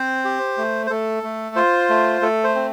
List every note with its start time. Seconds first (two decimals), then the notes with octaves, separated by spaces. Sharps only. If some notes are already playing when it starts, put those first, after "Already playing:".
Already playing: C4 C5
0.25 G4
0.58 A3
0.87 C5
0.90 A3 A4
1.23 A3
1.56 F4 C5
1.89 A3
2.22 A3 A4
2.44 C5
2.55 C4